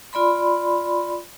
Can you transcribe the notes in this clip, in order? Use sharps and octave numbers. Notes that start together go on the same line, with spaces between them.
F4 D5 B5 C6